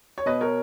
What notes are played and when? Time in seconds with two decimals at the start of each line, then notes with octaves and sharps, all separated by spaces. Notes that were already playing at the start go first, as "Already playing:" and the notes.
0.18 C#5
0.26 B2 B4 D#5
0.41 A#4 C#5